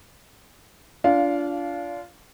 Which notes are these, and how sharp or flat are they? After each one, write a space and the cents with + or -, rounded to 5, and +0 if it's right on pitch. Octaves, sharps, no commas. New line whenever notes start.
D4 -25 F4 -20 F5 +0